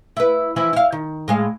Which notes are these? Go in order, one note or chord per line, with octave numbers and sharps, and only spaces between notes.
E4 B4
E3 F3 E4
E4 F5
D#3
A2 G#3 F5